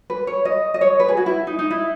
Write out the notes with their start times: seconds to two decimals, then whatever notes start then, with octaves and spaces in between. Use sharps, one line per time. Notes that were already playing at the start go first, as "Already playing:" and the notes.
0.10 B4
0.27 C#5
0.45 D#5
0.74 D#5
0.81 C#5
1.00 B4
1.08 G#4
1.17 F#4
1.26 E4
1.47 D#4
1.59 D#4
1.71 E4